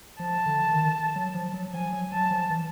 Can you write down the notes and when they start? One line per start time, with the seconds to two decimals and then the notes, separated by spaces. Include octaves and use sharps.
0.19 F3 A5
0.46 D3
0.71 D#3
1.16 F#3
1.34 F3
1.54 F#3
1.73 F3 G#5
1.93 F#3
2.12 F#3 A5
2.31 F3
2.50 E3